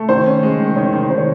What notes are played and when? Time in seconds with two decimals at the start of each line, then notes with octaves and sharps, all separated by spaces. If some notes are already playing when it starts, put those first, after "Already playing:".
Already playing: A3
0.09 D#3 C5
0.26 C#4
0.43 G#3
0.60 D#3
0.76 D#3 C#5
0.93 D#3
1.10 D#3 C5
1.18 C#5